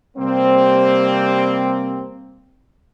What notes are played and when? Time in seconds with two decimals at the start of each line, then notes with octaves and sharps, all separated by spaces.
0.17 C3 G3 A#3 C4